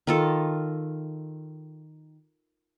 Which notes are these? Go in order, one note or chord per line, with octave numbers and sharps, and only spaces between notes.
D#3 F4 A4